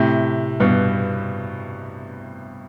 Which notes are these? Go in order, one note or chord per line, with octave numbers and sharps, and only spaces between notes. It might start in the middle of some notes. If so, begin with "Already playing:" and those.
Already playing: A2 C3
G2 B2